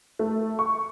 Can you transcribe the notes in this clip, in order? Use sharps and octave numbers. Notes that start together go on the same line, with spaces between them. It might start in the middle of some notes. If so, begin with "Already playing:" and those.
A3
C#6